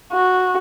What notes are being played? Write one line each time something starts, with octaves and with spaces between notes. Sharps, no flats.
F#4